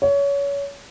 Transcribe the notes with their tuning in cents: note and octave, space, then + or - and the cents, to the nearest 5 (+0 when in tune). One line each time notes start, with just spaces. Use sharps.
C#5 +25